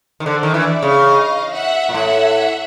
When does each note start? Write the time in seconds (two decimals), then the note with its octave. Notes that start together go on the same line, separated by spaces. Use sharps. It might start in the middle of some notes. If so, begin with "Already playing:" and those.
0.20 D#3
0.25 D3 C5 D5
0.43 D#3
0.54 E3 D5 E5
0.83 C#3
1.09 D#5 F5
1.53 E5 F#5
1.89 A#2
1.94 A2 E5 F#5